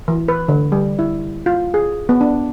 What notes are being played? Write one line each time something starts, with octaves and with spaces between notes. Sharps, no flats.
E3
B4
D3
G3
E4
F4
G#4
B3
D4